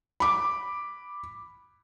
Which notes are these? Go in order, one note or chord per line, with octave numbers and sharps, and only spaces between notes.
B5 D6